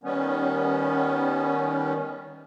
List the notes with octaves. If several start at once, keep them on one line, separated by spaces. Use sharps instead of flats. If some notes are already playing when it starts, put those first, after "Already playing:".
D#3 G3 B3 C#4